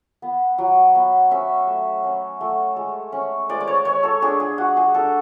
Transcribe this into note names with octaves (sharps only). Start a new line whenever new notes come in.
B3
F#3
B3
C#4 E5
A3
C#4
A3
G#3
C#4
G#3 D5
D5
C#5
G#3 C#5
A4
D4 G#4
G#4
G#3 F#4
G#4
D4 A4